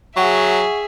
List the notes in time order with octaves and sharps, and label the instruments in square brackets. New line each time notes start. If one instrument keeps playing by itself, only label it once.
[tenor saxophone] F#3 [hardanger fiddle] G#4 E5 [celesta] F#5 G5 C#6